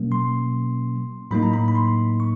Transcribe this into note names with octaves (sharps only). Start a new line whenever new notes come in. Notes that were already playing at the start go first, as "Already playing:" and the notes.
Already playing: B2 F#3 A#3 C#4
C6
A2 F#3 A#3 D#4 B5
A#5
B5
B5
C6
C#6